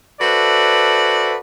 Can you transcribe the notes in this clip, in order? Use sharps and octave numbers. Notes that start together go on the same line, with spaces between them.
F#4 A4 B4 C5 D5 E5